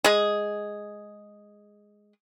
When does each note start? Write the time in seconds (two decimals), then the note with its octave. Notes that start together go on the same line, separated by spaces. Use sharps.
0.04 G#3 G#4